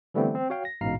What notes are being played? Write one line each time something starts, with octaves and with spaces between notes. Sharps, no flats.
D3 E3 G3 A3 B3 C4
C4
F#4 C#5 F5 G5
A#6
A1 G#2 B2 F5 A#5 C7